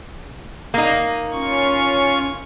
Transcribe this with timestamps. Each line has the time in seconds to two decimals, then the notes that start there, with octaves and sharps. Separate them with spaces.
0.74 A#3 D#4
1.32 C#4 F4 C#6